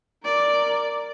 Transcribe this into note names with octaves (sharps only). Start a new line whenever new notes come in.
A#4 D5